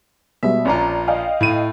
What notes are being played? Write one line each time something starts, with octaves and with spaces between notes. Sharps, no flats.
B2 G3 G#3 E5
A#1 C#4 F4 D5 A#5
D#5 F5 G5
A2 D#7